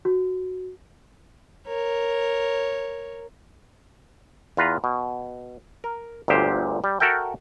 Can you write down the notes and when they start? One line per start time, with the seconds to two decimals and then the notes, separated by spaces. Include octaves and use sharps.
0.05 F#4
1.67 A#4 C#5
4.57 E2 F4 B4 A#5
4.84 B2
5.84 A#4
6.28 G1 D2 A#2 G4 C5
6.84 G3
7.00 F#4 A4 A#4 E5 G5